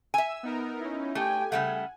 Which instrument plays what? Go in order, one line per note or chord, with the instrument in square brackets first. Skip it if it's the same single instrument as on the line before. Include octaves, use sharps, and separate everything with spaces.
[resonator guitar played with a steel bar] E5 G#5 [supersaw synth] E6
[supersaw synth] B3 D#4 A#4
C#4 D#4 E4
[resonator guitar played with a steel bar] A3 [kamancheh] G4 G5 [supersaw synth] G#5
[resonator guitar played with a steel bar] C#3 G3 A3 [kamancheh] F#5